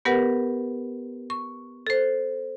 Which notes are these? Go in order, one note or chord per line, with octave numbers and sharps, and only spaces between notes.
B3 G4 A#4 B4 F#5
C#6
A4 C5